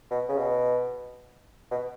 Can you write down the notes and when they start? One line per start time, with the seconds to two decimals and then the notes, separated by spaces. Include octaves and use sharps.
0.11 B2
0.29 C#3
0.38 B2
1.71 B2